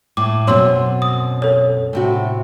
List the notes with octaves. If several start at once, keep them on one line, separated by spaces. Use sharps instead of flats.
A2 D6
F#2 B2 C4 C#5 C6 E6
D#6
A4 C#5
A2 C3 F#4